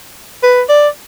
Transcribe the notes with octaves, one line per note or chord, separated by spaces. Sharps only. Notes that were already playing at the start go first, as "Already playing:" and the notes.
B4
D5